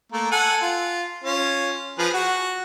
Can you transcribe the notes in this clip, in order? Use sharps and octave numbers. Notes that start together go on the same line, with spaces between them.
A3 A#3
A4 F#5 G#5
F4
C#4 F4
F3 G#4 B4
F#4